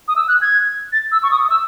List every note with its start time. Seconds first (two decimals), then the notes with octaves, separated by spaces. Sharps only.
0.08 D#6
0.16 E6
0.28 F#6
0.42 G#6
0.93 A6
1.12 E6
1.23 C#6
1.31 D#6
1.45 D#6
1.50 E6